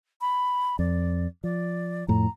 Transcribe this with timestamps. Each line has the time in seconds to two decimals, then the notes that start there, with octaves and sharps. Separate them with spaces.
0.21 B5
0.79 F2 D5
1.44 F3 D5
2.08 F2 A2 A#5